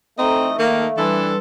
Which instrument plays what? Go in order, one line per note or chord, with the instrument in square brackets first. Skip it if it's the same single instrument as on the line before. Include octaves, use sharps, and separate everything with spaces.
[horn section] E3 D#4 D#5 [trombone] A3 [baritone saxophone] C4 [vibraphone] A4 A#5
[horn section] D#3 [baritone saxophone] A#3 [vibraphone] F5
[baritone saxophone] E3 [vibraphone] G3 B4 C6 [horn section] D4 A4